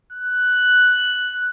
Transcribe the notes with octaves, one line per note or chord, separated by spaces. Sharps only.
F#6